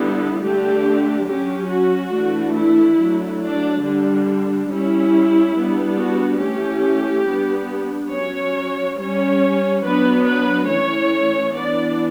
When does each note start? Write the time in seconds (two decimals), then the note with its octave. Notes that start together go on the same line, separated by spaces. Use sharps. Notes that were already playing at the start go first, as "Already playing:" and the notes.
Already playing: D3 G3 B3 D4 E4
0.41 D3 A3 D4 G4
1.26 F#3 C#4 G4
1.69 F#4
2.12 E3 A3 D4
2.55 E4
2.98 F#3 A3 D4
3.40 D4
3.84 D3 G3 D4
4.69 G3 C#4 E4
5.55 G3 B3 D4
5.99 F#4
6.41 E3 A3 C#4 G4
7.27 G3 B3 D4
8.13 F#3 C#4 C#5
8.99 G3 C#4 C#5
9.85 F#3 B3 D4 B4
10.27 B4
10.70 E3 A3 C#4 C#5
11.56 E3 B3 D4 D5